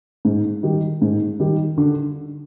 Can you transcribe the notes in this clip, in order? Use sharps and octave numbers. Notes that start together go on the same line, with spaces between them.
G#2
D#3 G3
G#2
D#3 G3
D3